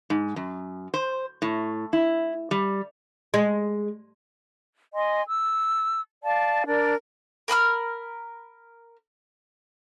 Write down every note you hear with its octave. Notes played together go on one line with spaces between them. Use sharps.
G#2
F#2
C5
A2
E4
G3
G#3
D#5 G#5 C6
E6
D5 F5 A5
D4 A#4 D5
A#4 B5 D#6 F6